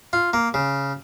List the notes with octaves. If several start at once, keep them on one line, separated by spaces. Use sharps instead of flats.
F4
A#3
C#3